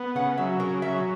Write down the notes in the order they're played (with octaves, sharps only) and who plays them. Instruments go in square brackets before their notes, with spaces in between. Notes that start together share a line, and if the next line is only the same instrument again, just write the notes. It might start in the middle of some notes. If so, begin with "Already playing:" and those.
Already playing: [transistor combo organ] B3
[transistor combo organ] C#3 [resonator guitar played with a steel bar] F#5
[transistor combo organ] F#3 [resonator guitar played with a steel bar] E5
[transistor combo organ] C#3 [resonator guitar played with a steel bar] A#4
[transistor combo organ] F#3 [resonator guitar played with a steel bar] E5